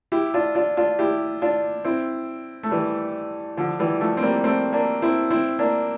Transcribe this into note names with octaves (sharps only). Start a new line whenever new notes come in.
E4 G4
D4 F4
D4 F4
D4 F4
E4 G4
D4 F4
C4 E4
A3
E3 G3
D3 F3
E3 G3
F3 A3
C4
G3 A#3
A3 C4
A#3 D4
C4 E4
C4 E4
A#3 D4